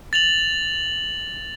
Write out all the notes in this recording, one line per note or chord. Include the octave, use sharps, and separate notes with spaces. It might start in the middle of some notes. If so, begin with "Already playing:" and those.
A6 F7 F#7